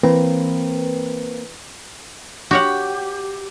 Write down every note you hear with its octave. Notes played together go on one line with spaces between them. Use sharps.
E3 A#3 C4 B4
F#4 G4 C#5 F#5